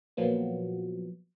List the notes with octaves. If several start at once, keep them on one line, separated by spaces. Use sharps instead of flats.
A#2 F3 F#3 B3